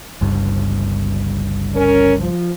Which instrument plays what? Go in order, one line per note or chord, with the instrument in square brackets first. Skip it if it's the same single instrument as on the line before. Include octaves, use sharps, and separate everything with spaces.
[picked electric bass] G1 C#2 G2
[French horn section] C#4 A#4
F3